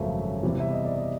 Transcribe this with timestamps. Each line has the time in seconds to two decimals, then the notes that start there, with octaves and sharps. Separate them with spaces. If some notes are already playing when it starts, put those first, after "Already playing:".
Already playing: G#1 F#2 C#3 F3 A3 E5
0.43 E2 C3 E3 G3
0.60 E5
0.72 D#5
0.85 D5
0.98 D#5